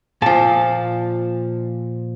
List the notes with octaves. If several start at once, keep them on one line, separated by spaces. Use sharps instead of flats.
A#2 F3 A5